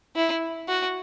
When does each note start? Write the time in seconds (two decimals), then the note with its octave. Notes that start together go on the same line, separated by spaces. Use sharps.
0.16 E4
0.68 F#4